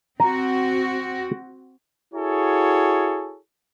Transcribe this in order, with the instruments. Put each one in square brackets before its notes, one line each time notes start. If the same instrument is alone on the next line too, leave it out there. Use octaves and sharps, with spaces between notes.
[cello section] C4 F#4 [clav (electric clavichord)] A#5
[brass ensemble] E4 F#4 G#4 A4 C#5